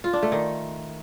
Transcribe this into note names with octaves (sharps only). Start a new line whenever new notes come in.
F4
D4
A3
D#3